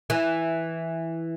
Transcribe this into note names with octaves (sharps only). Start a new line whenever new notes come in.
E3